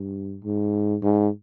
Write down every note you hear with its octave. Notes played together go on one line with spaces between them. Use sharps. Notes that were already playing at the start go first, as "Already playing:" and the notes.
Already playing: G2
G#2
G#2